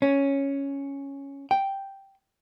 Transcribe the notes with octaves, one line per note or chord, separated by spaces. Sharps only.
C#4
G5